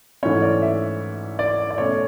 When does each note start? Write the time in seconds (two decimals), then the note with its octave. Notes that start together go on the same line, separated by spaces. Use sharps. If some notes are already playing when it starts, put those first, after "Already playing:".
0.23 G#2 E3 A3 C#4 C#5
0.42 D5
0.62 E5
1.39 D5
1.70 D5
1.78 B2 A3 C#4 C#5